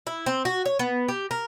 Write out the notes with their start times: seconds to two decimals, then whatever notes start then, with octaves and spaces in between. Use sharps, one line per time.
0.07 E4
0.26 C4
0.45 F#4
0.66 C#5
0.79 B3
1.08 G4
1.31 A#4